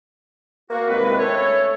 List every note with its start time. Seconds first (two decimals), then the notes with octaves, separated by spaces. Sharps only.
0.70 A#3 F#4
0.89 C2 D#3 G#3 C4 B4
1.19 A3 C#4 A4 C#5